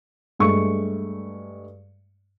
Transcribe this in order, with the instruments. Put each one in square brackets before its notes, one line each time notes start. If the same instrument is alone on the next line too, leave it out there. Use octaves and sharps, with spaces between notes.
[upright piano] G2 G#3 A3 C#6